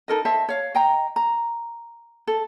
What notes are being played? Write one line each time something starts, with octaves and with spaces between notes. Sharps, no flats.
D#4 A4 A#4 D#5
C5 D#5 E5 A5
C#5 F5
D#5 G5 A#5
A#5
A4